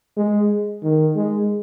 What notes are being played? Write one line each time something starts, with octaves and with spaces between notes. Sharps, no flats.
G#3
D#3
G#3